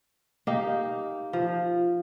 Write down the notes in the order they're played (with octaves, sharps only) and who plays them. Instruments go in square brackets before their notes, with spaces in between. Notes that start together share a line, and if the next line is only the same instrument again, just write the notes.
[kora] A#3 D#4 G4
F3